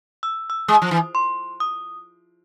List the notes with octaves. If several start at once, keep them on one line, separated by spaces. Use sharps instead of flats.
E6
E6
G#3 D#6
F3
E3
C6
D#6